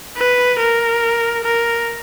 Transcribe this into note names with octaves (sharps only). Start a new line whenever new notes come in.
B4
A#4
A#4